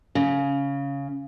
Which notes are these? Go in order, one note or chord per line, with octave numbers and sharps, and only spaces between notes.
C#3